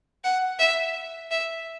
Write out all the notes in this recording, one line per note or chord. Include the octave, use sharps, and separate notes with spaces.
F#5
E5
E5